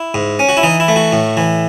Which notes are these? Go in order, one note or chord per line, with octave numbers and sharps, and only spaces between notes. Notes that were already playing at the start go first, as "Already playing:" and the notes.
Already playing: E4
G#2
C#4
F#4
E4
E3 D#4
E4
A3
F#4
A2
E3